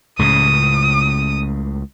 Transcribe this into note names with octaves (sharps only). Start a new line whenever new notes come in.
C#2 A2 C#3 D#6